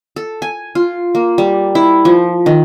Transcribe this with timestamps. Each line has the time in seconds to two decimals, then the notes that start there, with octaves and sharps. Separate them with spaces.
0.16 A4
0.42 G#5
0.75 F4
1.15 A#3
1.38 G3
1.75 E4
2.05 F3
2.46 D#3